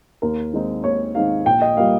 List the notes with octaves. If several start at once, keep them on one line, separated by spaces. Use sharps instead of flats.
D#2 A#4
D#3 G#3 C4 D#4
D#2 C#5
D#3 G#3 C4 D#4 F5
A#1 G5
D#5
A#2 G3 A#3 F5